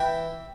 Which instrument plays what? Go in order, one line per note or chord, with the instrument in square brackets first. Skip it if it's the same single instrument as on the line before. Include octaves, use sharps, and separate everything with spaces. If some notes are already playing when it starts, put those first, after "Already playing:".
Already playing: [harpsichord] E3 E5 G5